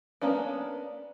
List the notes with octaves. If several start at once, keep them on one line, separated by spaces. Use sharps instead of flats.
A#3 B3 C#4 D4